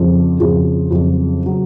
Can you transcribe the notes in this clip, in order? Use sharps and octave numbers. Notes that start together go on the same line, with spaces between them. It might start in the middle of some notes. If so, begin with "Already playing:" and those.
Already playing: F2 C#3 F3
F2 C#3 F3
F2 C#3 F#3
C#3 F#3